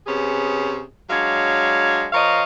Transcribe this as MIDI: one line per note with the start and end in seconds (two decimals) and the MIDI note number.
0.06 0.82 48
0.06 0.82 59
0.06 0.82 61
0.06 0.82 68
1.09 2.07 54
1.09 2.07 56
1.09 2.07 62
1.09 2.07 73
1.09 2.07 77
2.13 2.43 53
2.13 2.43 70
2.13 2.43 73
2.13 2.43 75
2.13 2.43 77